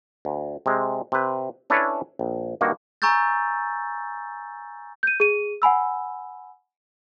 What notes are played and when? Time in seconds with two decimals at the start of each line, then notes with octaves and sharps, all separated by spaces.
0.25 D2
0.66 C3 G#3
1.12 C3 B4
1.70 C#4 D4 E4 A4 B4 C#5
2.19 A#1
2.61 G2 D#3 A#3 F#4 F#5
3.02 G#5 A#5 C#6 E6 G6 A6
5.03 G6 D#7
5.20 G#4 D#7
5.62 F#5 G#5 B5 E6